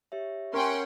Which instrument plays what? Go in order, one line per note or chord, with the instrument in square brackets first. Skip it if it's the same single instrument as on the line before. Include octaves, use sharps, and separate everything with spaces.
[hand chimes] G4 C#5 E5
[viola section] C#4 [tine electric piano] A#4 [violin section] F#5 G5 C6